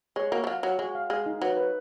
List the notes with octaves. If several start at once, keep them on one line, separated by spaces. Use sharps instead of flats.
G#3 C#5
A#3 F#4
F3
F#3 F5
F#3 C#5
G#3 F#4
F5
G#3 F5
D#4
F#3 B4
B4